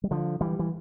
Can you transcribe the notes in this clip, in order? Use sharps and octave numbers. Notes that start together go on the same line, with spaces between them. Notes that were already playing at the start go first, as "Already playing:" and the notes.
G3
D3 F3
E3 G3
E3